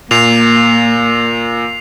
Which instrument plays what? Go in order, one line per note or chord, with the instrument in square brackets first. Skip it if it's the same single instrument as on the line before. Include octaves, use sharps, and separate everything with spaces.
[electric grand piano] A#2 [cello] A#3 [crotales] C7 F7